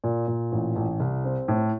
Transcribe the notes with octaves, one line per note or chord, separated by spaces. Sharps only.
A#2
A#2
A1
A1
C2
C4
A2